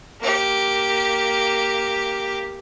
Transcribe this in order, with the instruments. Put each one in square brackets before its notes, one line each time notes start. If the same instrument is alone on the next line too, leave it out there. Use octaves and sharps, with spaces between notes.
[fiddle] A#3 G4